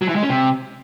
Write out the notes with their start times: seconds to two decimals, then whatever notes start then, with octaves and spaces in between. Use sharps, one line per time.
0.02 F#3
0.09 E3
0.16 G#3
0.23 C#4
0.29 C3